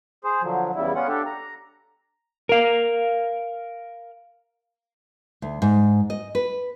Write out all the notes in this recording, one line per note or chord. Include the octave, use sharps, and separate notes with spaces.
G#4 C5
D3 F3 F#3
E2 C#3 G3 E4
B3 C#4 F4 F#5
D4 G4 A4
A#5
A#4 F5
D2
G#2
D#5
B4